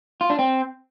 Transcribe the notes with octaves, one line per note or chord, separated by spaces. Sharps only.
F4
D4
C4